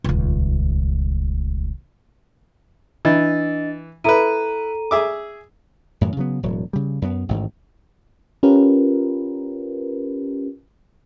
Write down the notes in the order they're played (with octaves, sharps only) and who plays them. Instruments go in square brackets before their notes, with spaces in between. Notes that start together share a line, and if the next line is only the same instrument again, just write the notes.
[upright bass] D#1 C#2
[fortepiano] E3 [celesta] D4 D#5 A6
[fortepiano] E4 B4 [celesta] A4 A#5 D#7
[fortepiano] G#4 E5 D6
[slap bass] F#2 A2 E3 F#3
C#3 F#3 B3
E1 A2 F#3
C#3 G3
F#2 B3
A1 G#2 D#3
[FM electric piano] C#4 F4 G4 A#4 B4